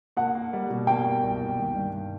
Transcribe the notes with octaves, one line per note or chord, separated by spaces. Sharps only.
A#3 F#5
A#3
G3
B2
A#3 G5
A#3
C2
C2
D#3
G2